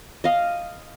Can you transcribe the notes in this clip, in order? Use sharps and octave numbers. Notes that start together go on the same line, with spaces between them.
D#5 F5